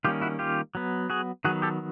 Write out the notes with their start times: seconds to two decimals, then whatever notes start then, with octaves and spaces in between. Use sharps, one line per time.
0.04 D#3 G3 A#3 C#4 F4 G4
0.21 E4 F#4
0.39 F4 G4
0.75 F#3 B3
1.10 F#4 G#4
1.45 D#3 F#3 B3 F#4 G#4
1.62 G4 A4